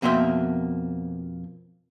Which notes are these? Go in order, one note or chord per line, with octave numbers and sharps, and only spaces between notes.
F2 B2 A#3 C5 E5